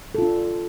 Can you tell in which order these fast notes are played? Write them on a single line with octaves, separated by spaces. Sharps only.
A4 F4 D4